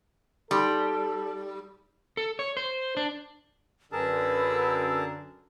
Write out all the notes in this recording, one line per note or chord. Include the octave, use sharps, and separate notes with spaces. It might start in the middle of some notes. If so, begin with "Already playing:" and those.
G3 D#4 A4 C6 D6
A4
C#5
C5
D4
F#2 D3 G#4 A#4 B4 A5 E6